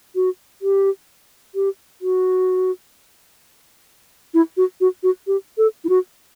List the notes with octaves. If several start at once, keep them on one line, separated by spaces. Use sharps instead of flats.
F#4
G4
G4
F#4
E4
F#4
F#4
F#4
G4
A4
E4
F#4